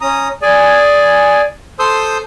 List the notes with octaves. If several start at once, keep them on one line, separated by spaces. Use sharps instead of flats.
C#4 A#5 D#6
G#4 D5 G#5
A4 C5 C6 D#6 E6 G6